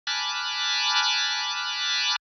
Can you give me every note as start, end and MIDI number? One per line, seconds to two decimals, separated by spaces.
0.07 2.16 80
0.07 2.16 81
0.07 2.16 83
0.07 2.16 86
0.07 2.16 89
0.07 2.16 90